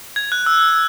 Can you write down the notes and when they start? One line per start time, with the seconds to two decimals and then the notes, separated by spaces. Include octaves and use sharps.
0.16 G#6
0.32 F#6
0.46 E6